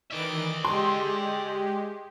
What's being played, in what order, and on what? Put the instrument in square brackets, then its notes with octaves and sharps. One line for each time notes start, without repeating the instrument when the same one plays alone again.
[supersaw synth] D#3 E3 D7 [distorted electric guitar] D5 E5
[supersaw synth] G#3 G4 [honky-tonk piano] C6